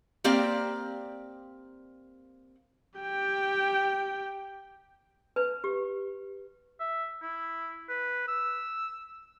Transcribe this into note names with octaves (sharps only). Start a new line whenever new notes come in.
A#3 C4 G4 D5 F5
G4 G5
B4
G4
E5
E4
B4
E6